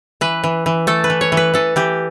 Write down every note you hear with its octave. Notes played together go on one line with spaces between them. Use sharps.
E3 B4
E3
E3
A3 A4
B4
E3
C#5
E3
B4
E3 A4
E3 G4